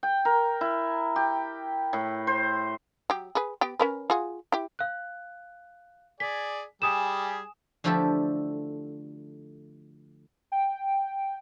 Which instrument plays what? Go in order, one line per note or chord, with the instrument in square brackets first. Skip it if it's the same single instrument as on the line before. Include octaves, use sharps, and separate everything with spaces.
[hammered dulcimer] G5
A#4
E4
G4
A2
C5
[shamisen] F#3 G4
G#4 B4
B3 G4 G5
C#4 A#4 B4
F4 F#4 G#4
E4 G4
[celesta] F5 F#6
[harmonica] G#4 D5 G#5 [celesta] B6
[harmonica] G3 G4 G#4 [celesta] G#5 D#6 E7
[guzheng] D3 F3 A3 E4 G4 A4
[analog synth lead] G5